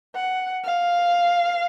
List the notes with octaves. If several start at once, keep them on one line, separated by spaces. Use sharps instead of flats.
F#5
F5